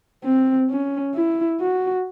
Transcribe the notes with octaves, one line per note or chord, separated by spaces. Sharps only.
C4
C#4
E4
F#4